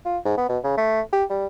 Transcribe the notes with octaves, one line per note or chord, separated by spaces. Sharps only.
F4
G#2
B3
B2
C#3
A3
G4
G3